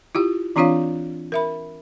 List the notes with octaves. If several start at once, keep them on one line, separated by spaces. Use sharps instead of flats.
E4 F4 G4
E3 C4 D4 F4 C#5 F5
A#4 E5 B5